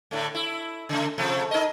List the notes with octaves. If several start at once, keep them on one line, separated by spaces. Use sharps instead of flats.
A2 D3 A3
E4
C#3 A3
C3 F3 A3
D#4 A#4 D#5